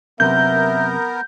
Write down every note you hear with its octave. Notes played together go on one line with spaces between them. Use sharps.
F#2 C3 B3 A#4 E5 G6